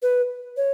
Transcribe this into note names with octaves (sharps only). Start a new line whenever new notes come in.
B4
C#5